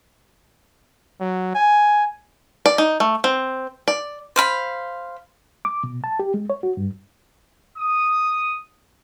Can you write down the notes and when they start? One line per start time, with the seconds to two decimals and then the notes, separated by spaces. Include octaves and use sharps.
1.20 F#3
1.55 G#5
2.66 D5
2.78 D#4
3.00 A3
3.24 C4
3.88 D5
4.36 C5 F5 B5
5.65 D6
5.84 B2
6.04 A5
6.19 G4
6.34 G#3
6.50 C#5
6.63 F#4
6.77 G2
7.79 D#6